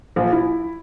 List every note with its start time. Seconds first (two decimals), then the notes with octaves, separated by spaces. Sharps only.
0.16 A#1
0.32 E4